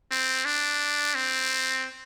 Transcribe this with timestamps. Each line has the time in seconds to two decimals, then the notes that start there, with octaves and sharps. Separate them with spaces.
0.11 C4
0.45 D4
1.15 C4